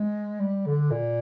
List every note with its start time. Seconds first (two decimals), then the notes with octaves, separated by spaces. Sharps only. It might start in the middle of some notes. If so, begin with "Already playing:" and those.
Already playing: G#3
0.40 G3
0.66 D3
0.91 A#2